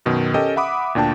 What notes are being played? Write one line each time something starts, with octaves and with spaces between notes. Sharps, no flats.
F#2 B2 D#3
C#4 G4 A4 A#4 D#5 G5
E5 F#5 B5 D6 D#6
D2 A#2 D4 G5 A5